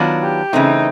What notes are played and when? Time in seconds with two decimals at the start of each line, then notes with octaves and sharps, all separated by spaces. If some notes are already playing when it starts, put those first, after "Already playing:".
Already playing: D#3 F#3 B3 D4 F4
0.22 G4
0.53 C#3 E3 A3 C4 D#4